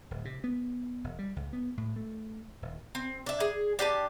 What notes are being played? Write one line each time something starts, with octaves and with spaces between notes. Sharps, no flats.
D1
C3
B3
E1
G3
C#2
B3
A2
A3
D#1
C4
D4 E5
G#4
D4 G4 G#5 A5